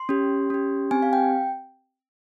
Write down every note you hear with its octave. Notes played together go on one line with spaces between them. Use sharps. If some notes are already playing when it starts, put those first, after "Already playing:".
Already playing: C6
C#4 G4
C#4 G4
C4 G4 G#5
F5
G5